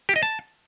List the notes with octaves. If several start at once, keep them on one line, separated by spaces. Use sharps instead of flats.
G4
D#5
A5